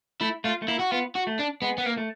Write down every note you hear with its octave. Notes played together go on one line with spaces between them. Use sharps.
A3 E4
A3 F4
A3
A#3 E4
F#4
B3 F4
F#4
A3
D4
G#3 B3
B3
A#3
A3